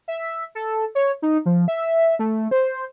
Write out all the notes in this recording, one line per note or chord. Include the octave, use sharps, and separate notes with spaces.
E5
A4
C#5
D#4
F3
E5
A3
C5